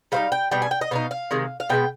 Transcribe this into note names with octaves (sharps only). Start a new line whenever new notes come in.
G3 C4 D#4 F5
G5
B2 G3 D4 G5
G#5
G5
D#5
B2 B3 D#4 F5
F5
C3 D#3 G#3
F5
B2 G#3 B3 G5